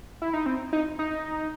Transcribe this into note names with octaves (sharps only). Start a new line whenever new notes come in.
E4
D#4
C4
D#4
D#4